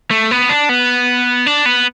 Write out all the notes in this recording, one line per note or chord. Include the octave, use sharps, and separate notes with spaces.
A3
B3
D4
B3
D4
B3